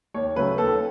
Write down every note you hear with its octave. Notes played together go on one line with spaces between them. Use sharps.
D#2 C#5
C#3 F#3 A3 B4
D#2 A4